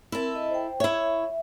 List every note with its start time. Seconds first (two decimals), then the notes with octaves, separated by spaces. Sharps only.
0.12 C4 E4 A4 A#4
0.35 D#5
0.50 C5 G5
0.80 E4 C#5 E5